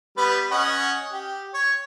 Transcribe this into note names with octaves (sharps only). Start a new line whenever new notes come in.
G3 B3 B4
C#4 D#5 F#5
G4
C#5